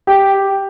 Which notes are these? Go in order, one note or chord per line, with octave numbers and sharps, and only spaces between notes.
G4